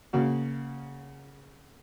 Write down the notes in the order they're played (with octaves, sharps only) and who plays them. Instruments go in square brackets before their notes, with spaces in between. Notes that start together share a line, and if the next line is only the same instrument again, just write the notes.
[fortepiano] C#3 A#3 F#4